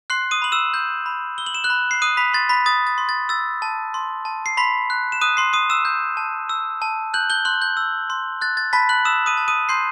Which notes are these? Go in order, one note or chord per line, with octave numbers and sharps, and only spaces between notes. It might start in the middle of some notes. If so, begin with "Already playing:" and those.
C6 F#6 C7
D#6 D#7
B5 F#7
E6 E7
G6
B5
E6 G7
F#7
E7
F#6 F#7
B5
C7
D#6 F#6 D#7
B5 B6
C6 A6
B5 B6
D#6 A6
A6
C6
A6
E6 A6
A5
C6
A5
C7
B5 C6 B6
F#6
E7
D#6 F#6 D#7
C6 C7
C6 D#6 D#7
E6 E7
G6
A5
E6
A5
F#6 G6 F#7
G6 G7
C6 F#6 F#7
G6
E6
C6
F#6 A6
A6
A5 B5 B6
F#6 F#7
D#6 E6 E7
D#6 D#7
A5
D#6 D#7
C6 G6 C7